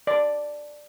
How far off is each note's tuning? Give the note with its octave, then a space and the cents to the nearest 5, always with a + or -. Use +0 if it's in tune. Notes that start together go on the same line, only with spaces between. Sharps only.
D5 +5